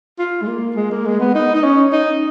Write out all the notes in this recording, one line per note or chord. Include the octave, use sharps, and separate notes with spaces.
F4
G#3
A#3
G#3
A#3
G#3
B3
D#4
D#4
C#4
D#4